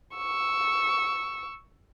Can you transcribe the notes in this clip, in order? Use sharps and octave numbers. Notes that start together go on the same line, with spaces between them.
C#6 E6